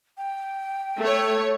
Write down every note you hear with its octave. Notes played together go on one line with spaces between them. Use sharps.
G5
A3 C#5